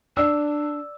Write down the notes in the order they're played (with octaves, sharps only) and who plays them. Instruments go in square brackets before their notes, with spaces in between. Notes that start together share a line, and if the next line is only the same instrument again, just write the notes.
[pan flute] D4 [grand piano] D5 E6